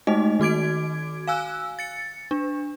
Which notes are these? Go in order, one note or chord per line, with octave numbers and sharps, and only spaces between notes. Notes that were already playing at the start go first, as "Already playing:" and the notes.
G#3 A3 D#4 D#5
D#3 F#4 D6 G#6 D7
F5 G#5 E6 F#6
A6 C#7
D4